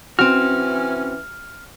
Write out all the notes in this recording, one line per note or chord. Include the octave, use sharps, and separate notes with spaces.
E3 C4 C#4 F#4 F6